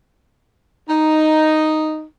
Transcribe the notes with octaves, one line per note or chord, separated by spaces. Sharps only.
D#4